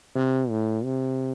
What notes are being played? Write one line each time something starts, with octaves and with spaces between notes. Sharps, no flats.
C3
A2
C3